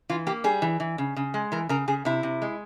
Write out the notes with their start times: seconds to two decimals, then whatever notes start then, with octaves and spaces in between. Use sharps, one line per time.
0.09 E3 F4
0.27 A#3 G4
0.44 G3 G#4
0.62 E3
0.80 E3
0.98 C#3
1.16 C#3
1.34 G#3
1.52 E3 A#4
1.69 C#3 A#4
1.88 C#3 G#4
2.05 C3 E4
2.23 C3
2.42 G#3